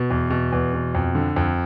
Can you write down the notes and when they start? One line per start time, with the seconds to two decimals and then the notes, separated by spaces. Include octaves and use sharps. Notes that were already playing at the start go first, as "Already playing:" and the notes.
Already playing: B2
0.10 E2
0.30 B2
0.52 E2
0.73 B2
0.95 F2
1.15 D3
1.36 F2